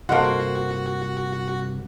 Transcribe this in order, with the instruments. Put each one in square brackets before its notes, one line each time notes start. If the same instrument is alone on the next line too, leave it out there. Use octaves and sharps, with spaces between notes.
[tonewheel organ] G2 C3 [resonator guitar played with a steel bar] A#3 C5 [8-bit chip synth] F#4 [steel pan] A4 D#5 F#5